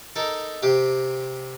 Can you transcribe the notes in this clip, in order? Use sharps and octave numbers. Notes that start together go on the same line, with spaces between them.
D#4 A4 A#4
C3 G4